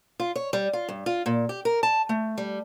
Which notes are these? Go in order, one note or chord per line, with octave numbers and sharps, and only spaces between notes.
F4
C#5
G3
F4
G2
F4
A#2
G4
A#4
A5
A3
G3